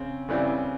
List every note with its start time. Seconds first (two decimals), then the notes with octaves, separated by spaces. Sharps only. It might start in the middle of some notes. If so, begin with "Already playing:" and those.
Already playing: C#3 C4
0.29 C#3 E3 G3 C4